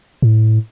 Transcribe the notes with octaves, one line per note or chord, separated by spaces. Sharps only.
A2